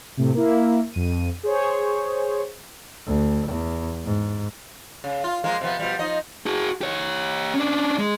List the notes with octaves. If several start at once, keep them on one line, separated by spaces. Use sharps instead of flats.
A2 C3
A#3 E4
F2 D#7
G#4 C5 C#5
D2
E2
G#2
C#3
F4
F3 G#3 A#3
C3 F3 B3
B2 F3 G3
F3 D#4 D#5
F#4 G#4
G4 C#5
C#4 D4
G#3